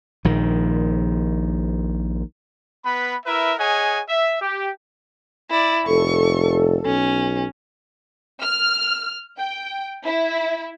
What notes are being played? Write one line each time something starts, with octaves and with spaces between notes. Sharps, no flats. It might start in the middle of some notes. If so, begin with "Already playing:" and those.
A#1 D#3
B3 B4 B5
E4 A#4 B4 E5
G#4 C#5 D#5 F#5 G#5
E5
G4
E4 D5
F1 A4 C#6
B1 C#4
F6
G5
E4